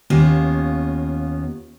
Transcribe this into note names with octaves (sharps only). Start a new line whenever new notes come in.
D#2 A#3 B3 C#4 F4